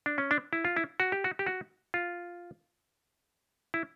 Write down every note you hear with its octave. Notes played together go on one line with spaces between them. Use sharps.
D4
C#4
D4
E4
F4
E4
F#4
G4
F#4
G4
F#4
F4
E4